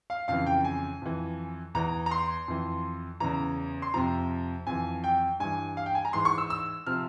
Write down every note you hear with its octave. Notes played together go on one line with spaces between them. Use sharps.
F5
F2 C#3 E3 F5
G5
G#5
F2 E3
E2 E3 A#5
A#5
C6
F2 E3
E2 C#3 E3 A#5
C6
F2 C3 F3 A#5
F2 E3 G#5
G5
G2 E3 G#5
F5
G5
G#5
A#5
G#2 E3 C6
C#6
E6
E6
C3 F3 F6